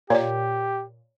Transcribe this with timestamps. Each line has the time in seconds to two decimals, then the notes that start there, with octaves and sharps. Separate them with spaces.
0.10 A#2 G4 C#5 D5